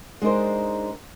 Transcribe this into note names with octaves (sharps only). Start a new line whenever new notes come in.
G#3 D4 D#4 A#4 C5